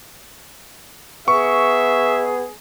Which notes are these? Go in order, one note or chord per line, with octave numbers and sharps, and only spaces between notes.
B3 G#4 E5 C#6